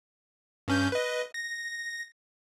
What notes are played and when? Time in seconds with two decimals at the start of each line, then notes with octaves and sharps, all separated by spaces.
0.68 G2 C#4 G6
0.92 B4 D#5
1.34 A#6